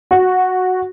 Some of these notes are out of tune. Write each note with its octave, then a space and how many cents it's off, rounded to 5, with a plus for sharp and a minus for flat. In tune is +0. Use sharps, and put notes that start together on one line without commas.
F#4 -5